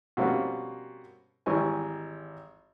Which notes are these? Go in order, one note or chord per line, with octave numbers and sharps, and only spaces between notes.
B2 F3 G3 A#3 C4 C#4
G#1 E3 G3 D#5 G#5 C#6